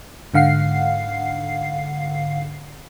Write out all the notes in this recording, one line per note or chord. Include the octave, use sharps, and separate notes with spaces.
G#2 D3 F5 F#5 C7